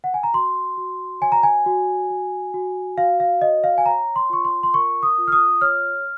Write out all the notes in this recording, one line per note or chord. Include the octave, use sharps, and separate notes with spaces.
F#5
G#5
A#5
F#4 C6
F#4
C#5 G#5
A#5
G#5
F#4
F#4
F#4
F#4 F5
F5
C#5 D#5
F5
G#5
C#5 A#5
C6
F4 C#6
C6
C6
A#4 C#6
D#6
F4
F6
D#6
C#5 F6